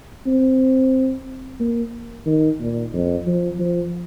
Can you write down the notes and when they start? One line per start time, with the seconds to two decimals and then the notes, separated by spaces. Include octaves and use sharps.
0.27 C4
1.60 A#3
2.26 D#3
2.60 A#2
2.93 F2
3.27 F3
3.59 F3